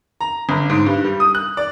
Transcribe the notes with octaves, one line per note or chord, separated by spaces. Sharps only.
A#5
G1
G#2
G2
G3
D#6
F#6
D5